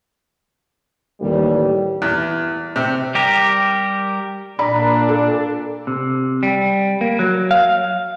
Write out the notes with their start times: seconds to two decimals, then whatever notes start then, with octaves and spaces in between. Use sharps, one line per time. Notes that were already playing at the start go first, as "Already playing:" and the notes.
1.21 A1 D#2 G3
2.02 E2
2.76 C3
3.15 G3 G4 A#4
4.59 A#2 D4 D5 A#5 B5
5.09 A4
5.87 C3
6.43 G3
7.01 A#3
7.19 F#3
7.51 F5